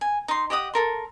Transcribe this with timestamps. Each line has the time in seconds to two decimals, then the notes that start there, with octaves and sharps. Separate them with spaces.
0.01 G#5
0.28 D#4 C6
0.50 G4 D#5 F#5 D#6
0.74 A4 A#4 C6